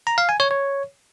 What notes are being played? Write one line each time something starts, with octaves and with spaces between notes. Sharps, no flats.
A#5
F5
G#5
C#5
C#5